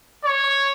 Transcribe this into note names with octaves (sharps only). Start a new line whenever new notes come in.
C#5